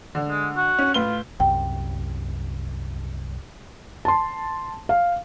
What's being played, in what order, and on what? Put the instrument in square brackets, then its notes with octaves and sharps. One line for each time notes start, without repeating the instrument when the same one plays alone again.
[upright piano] D3
[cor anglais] G#3
F#4
[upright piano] C#4
[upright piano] A2 B4 G7 [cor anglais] F4
[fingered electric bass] C2 F#2 [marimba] G5
[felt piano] A5 C6
F5